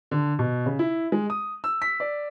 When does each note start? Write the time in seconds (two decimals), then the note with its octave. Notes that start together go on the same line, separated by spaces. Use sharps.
0.11 D3
0.39 B2
0.66 C#3
0.79 E4
1.12 G#3
1.30 D#6
1.64 E6
1.82 B6
2.00 D5